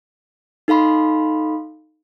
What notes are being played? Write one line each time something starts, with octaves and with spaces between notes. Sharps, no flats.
D#4 A4 F5 B5 C6